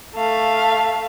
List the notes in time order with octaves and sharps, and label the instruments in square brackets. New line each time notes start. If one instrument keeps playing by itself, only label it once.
[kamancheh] A3 F5